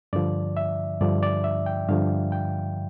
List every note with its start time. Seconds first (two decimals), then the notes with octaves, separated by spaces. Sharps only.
0.13 G2 D3 F3 D5
0.57 E5
1.01 G2 D3 F3 D5
1.23 D5
1.44 E5
1.66 G5
1.88 G2 D3 F3 F5
2.32 G5